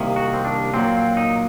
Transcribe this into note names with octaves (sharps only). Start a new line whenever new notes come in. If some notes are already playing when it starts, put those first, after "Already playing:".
Already playing: C2 C3 D#3 A#3
F#4
C4
D4
A#2 F#3 A#3 C4
C4
D#4